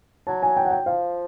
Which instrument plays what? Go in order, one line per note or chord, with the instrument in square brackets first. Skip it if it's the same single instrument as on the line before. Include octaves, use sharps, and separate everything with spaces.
[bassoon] F#3 [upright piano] A5
[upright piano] G#5
G5
F#5
G5
[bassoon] F3 [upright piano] F5